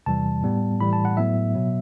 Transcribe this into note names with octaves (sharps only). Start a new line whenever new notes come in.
E2 C3 E3 G3 A5
A2 G3 B3
A2 E3 G3 B5
A5
F#5
A2 F#3 B3 E5
B2 F#3 B3